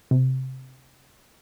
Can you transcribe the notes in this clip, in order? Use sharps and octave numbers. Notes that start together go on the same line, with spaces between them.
C3